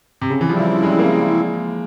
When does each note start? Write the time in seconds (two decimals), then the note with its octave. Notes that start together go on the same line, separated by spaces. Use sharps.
0.21 C3
0.30 C#3
0.41 E3
0.49 C#3 F3 G3 C4 E4
0.83 G#3
0.99 A#3